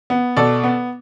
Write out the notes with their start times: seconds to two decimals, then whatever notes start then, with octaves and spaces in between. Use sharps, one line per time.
0.10 B3
0.36 B2 A4 D5
0.63 B3